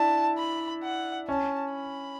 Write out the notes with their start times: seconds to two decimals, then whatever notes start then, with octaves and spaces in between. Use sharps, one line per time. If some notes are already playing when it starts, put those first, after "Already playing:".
Already playing: D4 E4 A5
0.38 B5
0.83 F#5
1.28 C#4 A5
1.73 B5